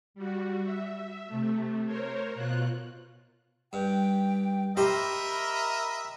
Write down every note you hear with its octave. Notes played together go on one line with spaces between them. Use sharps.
G3 F#4
E5
C3 A3
A#4 C5 C#5
B2 F4 F#6
G2 G5
G4 A#4 C5 D#5 E5 B5